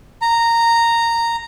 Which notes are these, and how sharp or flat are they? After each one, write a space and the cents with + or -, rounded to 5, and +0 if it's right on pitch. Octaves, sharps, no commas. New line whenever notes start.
A#5 -10